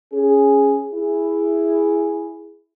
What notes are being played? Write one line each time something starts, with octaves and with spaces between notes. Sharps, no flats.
C#4 G#4
E4 G#4